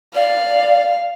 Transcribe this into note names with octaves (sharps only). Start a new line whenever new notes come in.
D5 F5